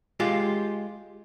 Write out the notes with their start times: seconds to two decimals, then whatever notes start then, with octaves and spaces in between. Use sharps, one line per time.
0.20 G#3 F4 G4